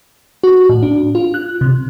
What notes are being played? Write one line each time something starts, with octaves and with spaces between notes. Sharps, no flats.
F#4
A2
D4
F4
F#6
C3